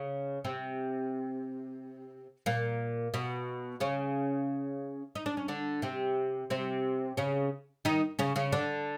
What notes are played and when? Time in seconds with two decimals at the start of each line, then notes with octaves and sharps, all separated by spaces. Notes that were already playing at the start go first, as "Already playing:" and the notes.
Already playing: C#3 C#4
0.45 C3 C4
2.46 A#2 A#3
3.14 B2 B3
3.80 C#3 C#4
5.15 D#4
5.26 D4
5.37 C#4
5.48 D3 D4
5.82 C3 C4
6.50 C3 C4
7.17 C#3 C#4
7.85 D#3 D#4
8.19 C#3 C#4
8.36 C#3 C#4
8.52 D3 D4